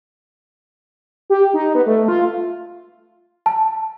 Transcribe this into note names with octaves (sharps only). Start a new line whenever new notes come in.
G4
D#4
B3
A3
F4
A5